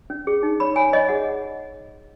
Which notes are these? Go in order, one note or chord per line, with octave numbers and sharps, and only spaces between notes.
C#4
G#4
D#4
C#5 B5
C#5 G#5
C#5 D#5
G#4 F#5